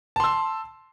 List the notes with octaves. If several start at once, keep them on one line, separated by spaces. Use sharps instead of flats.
A5 C6 E6